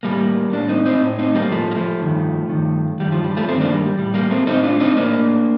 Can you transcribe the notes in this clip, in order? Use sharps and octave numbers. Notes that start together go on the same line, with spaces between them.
A2 G3 A#3
A2 A#3 D4
C4 D#4
C4 D#4
A2
C4 D#4
G3 A#3
A2 F3 A3
A#3
F3 A3
G2 D#3
G2 D#3
G2 D#3 G3
F3
G3
F3 A3
G2 D#3 A3 C4
A#3 D4
G3
G3
A2 G3
G3 A#3
A3 C4
A2 C4 D#4
D4 F4
C4 D#4
A2 A#3 D4